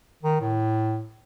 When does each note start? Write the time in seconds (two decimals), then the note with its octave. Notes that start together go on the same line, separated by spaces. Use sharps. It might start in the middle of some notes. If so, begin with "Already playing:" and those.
0.23 D#3
0.41 A2